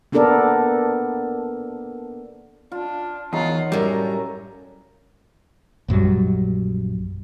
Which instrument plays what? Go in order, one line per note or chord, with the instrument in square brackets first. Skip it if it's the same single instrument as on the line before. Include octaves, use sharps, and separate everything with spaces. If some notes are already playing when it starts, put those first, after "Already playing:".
[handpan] A#3 B3 D4 A4 A#4 D5
[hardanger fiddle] D4 [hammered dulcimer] F4
[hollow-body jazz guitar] E2 [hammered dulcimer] D#4 A#4 C#5 [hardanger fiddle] F4 F#5
[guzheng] F#2 A2 [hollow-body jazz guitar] G3 [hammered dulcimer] E5 [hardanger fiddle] A#5
[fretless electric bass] A#1 F#2 F#3 G3